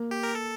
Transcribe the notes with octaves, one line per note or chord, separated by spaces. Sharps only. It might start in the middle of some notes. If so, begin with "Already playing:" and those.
Already playing: A#3
G4
A#4
A4